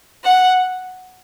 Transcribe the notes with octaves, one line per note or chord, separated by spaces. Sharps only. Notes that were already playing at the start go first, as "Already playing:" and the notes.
F#5